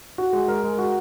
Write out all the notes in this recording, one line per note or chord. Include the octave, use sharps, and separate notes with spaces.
F#4
G#3
A#4
G#3
F#4